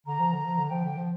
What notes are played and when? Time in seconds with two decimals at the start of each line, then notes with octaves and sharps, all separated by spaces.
0.06 D3 A#5
0.20 F3
0.33 D3
0.45 F3
0.58 D3
0.70 F3 G5
0.85 D3
0.98 F3